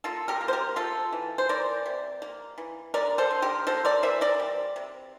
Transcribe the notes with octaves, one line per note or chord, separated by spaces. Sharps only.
A#3 F4 A4
G4 A#4
A#3
C5
G4 A#4
A3 F4 A4
E3
C5
E3 A#4 D5
C3
A#3
E3
D3 A#4 D5
A4 C5
D3
G4 A#4
A#3 A4 C5
A#4 D5
E3 C5 E5
A#4 D5
G3
C3